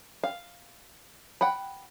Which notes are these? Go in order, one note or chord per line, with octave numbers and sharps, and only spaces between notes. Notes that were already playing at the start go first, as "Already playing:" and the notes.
F5
F#5 G5 B5